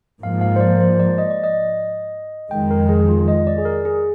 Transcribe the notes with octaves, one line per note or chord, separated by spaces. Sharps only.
G#2 F3 A#3 F5
F5
C5
D5
C5
D5
D#5
D5
D#5
F2 D#3 G#3 G5
A#4
G#4
F4
D#5
D5
G#4
A#4
G#4